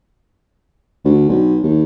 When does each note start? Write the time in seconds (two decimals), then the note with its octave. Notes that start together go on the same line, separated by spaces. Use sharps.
1.05 D2
1.28 B1
1.63 D#2